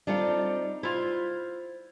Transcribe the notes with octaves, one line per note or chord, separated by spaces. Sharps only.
G3 C4 D4 D#4 F4 A4
E4 F4 C5